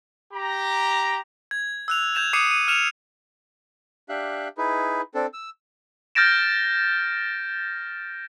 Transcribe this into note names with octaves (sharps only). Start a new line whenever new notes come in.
G4 A#5
G#6
E6 F#6 F7
G6 G#6 E7 F7
D6 D#6 C7 C#7 D#7 E7
D#7
F6 C#7 E7 F7
D4 G4 E5 F5 F#6
D#4 E4 G#4 B4
C4 D4 A4
E6
F6 G6 A6 A#6 D7 E7